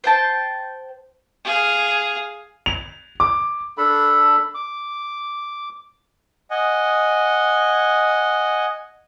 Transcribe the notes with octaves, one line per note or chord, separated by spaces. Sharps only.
C5 G5 A5
G#4 F5
F7
D6
D4 A4 B5
D6
D#5 F#5 G#5